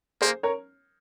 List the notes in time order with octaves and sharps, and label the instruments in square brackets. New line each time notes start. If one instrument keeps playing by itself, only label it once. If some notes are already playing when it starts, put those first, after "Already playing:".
[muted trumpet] A#3 [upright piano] G#4 C5
[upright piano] A#4 C#5